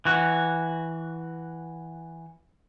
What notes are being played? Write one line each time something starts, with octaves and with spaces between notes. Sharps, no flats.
E3 F#4